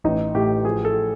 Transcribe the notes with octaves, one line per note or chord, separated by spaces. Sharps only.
A1 D#4
A2 G4
F3 G#4
A4